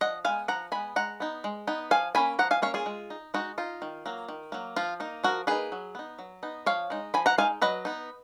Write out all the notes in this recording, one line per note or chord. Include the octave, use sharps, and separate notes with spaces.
F3 D#5 F#5
G#3 B3 F5 G#5
F3 F#5 A#5
G#3 B3 G#5 B5
G#3 F#5 A#5
B3 D#4
G#3
B3 D#4
F3 F5 G#5
A#3 C#4 G#5 B5
F3 F#5 A#5
F5 G#5
A#3 C#4 C#5 F5
F4 G#4
G#3
D#4
G#3 D#4 F#4
D#4 F4
D#3
F#3 A#3
D#3
F#3 A#3
F3 F4
A#3 D#4
F3 F#4 A#4
A#3 D#4 G#4 B4
F#3
B3 D#4
F#3
B3 D#4
F3 C#5 F5
G#3 D#4
F3 G#5 B5
F#5 A#5
G#3 D#4 F5 G#5
F#3 B4 D#5
B3 D#4